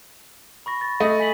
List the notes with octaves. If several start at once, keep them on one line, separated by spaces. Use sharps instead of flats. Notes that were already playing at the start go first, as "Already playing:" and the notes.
B5 C#6 A#6
A6
A3 D#5
G#5 B6 F#7